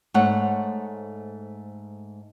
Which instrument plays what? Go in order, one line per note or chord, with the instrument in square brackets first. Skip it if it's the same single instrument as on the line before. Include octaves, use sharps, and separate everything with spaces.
[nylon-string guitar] G#2 A3 C5 C#5 F#5